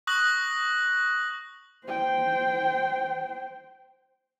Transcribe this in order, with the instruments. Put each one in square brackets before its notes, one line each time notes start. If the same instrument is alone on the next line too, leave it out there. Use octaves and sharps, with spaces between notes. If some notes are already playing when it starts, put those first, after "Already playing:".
[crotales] C#6 D#6 F#6 A#6 F#7
[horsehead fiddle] C5 G5